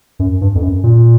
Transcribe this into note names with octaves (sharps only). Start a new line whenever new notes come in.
F#2
G2
F2
F#2
A#2